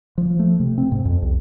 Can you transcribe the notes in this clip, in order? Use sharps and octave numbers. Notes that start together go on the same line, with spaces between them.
F3
A3
C3
C4
G#2
F2
C2